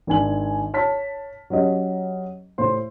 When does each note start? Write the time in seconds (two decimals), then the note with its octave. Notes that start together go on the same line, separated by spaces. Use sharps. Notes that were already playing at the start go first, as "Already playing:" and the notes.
0.07 G#1 D4 G#5 F#7
0.74 C#5 A5 F6 B6
1.50 F#3 C#4 G4 D#5
2.58 A2 C5 C6